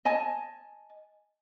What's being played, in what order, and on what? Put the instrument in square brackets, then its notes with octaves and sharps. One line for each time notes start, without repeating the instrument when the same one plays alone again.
[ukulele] D#5 G#5 A5